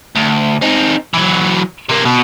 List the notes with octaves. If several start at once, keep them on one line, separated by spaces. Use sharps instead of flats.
D2
C4 D#4
E3 F#3
C3 A#3
B2